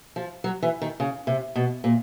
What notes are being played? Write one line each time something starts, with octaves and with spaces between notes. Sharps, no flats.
F3
F#3
E3
D#3
C#3
C3
B2
A#2